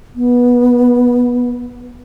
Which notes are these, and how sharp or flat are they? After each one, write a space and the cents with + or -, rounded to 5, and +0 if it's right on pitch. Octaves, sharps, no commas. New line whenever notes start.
B3 -15